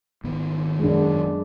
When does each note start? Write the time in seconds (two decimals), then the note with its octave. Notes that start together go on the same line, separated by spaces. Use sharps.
0.24 G#1 D#3 B3
0.80 F#2 G#3 D4